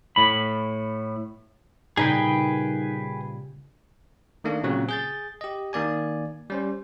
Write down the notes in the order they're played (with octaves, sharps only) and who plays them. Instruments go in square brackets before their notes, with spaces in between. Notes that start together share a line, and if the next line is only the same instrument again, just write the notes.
[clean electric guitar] A2 B5
[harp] A#2 C#3 G3 [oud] D#4 [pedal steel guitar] G#4 B4 G5
[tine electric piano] D#3 A3 A#3 D4
A#2 C#3 F#3 C4
G#4 G6 A6
G4 D#5
D#3 A#3 D5 G#5
G3 C#4 C5